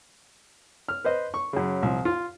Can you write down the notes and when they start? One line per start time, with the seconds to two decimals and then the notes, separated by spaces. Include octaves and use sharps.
0.88 F6
1.05 B4 C5 D#5
1.34 C#6
1.53 F#2 C#3
1.83 C2 F3
2.05 F4